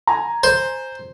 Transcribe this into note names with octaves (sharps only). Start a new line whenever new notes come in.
G#5 A#5
C5